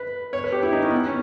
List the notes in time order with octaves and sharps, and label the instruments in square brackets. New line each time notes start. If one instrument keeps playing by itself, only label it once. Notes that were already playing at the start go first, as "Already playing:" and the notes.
Already playing: [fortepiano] B4
C#5
B4
G4
E4
D#4
C#4
B3
C#4